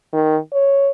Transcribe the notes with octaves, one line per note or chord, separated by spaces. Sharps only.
D#3
C#5